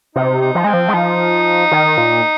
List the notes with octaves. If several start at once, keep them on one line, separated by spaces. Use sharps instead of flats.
C3 D#4
D#4
F3
G#3 C4
F3
G#3
F3 D#4
D#3
A#2